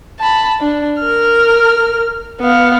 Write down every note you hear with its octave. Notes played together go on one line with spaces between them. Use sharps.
A5 B5
D4
A#4 F6
B3 F5